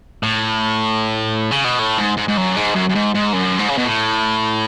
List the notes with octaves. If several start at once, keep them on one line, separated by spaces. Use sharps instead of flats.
A2
C#3
B2
A2
G#2
G#2
G#2
F#2
G#2
F#2
F#2
G#2
G#2
F#2
G#2
C#3
B2
A2